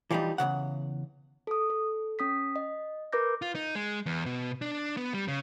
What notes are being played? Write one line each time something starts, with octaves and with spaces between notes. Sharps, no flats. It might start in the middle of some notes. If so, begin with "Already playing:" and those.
E3 F3 G3 B3 D#4
E2 G2 C#3 F#5
A4 D#6
A4
C#4 D#6 B6
D#5
A#4 B4 D6 G6 A#6
F4
D#4
G#3
E2
B2
D4
B3
G3
C#3